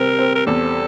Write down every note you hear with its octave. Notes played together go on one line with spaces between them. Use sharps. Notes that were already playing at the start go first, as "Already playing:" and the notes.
Already playing: C3 G3 C4 A#4
C4
A#4
E2 A4